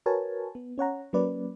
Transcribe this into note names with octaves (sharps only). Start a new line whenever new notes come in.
F#4 A#4 B4 C#5 G#5 A5
B3
C#4 C#5 F#5 A#5
F#3 A#3 C#4 B4 D5